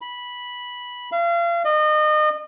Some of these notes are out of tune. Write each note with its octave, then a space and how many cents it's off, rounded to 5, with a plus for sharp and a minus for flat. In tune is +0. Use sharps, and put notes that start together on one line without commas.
B5 -10
F5 -35
D#5 -30